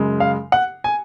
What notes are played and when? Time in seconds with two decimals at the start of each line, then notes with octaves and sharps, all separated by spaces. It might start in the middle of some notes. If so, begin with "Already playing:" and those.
Already playing: F#2 C#3 G#3
0.20 F5
0.52 F#5
0.84 G#5